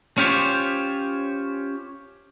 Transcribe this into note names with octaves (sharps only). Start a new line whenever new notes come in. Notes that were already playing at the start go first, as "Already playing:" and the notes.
C#4 F4 G4 C5 C#5